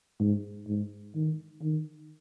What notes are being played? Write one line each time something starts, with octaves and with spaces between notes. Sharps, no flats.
G#2
G#2
D#3
D#3